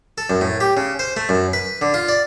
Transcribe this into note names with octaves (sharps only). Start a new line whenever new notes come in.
A4
F#2
A2
G4
C#3
C5
A3
F#2
B4
D3
F4
D5